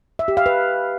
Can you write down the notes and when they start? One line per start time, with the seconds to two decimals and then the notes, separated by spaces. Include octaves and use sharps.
0.19 E5
0.28 G4
0.37 F5
0.46 B4